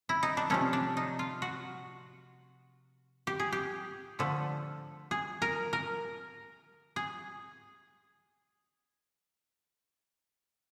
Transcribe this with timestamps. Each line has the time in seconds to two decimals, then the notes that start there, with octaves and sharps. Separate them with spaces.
0.09 E4
0.23 D#4
0.37 D4
0.50 C3 F3 A3 C#4
0.73 D4
0.97 D#4
1.19 F4
1.42 F#4
3.27 G4
3.39 G#4
3.53 G4
4.19 D3 F3 A3
5.11 G#4
5.42 A#4
5.73 A#4
6.96 G#4